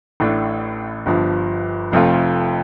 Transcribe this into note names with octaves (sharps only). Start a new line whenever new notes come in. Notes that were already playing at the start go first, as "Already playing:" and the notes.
A1 A2 A3 D4
G1 G2 F3
F1 F2 F3 A3 F4